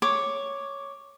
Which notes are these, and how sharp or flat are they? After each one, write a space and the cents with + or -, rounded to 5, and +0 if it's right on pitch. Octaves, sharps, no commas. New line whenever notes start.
C#5 +0 D6 +0